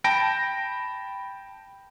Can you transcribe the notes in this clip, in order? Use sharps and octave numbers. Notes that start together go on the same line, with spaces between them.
G5 A5 B5 A#6 D7